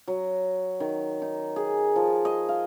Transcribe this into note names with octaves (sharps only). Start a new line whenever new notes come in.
F#3
D#3
D#4
G#4
F3
D#5
F5